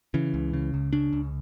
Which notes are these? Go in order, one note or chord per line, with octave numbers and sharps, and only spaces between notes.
C#3 E3
C#2
C#3
C#2
C#3 D4
C#2